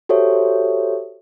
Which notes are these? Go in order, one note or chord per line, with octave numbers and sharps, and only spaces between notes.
F#4 G4 A4 C5 C#5 E5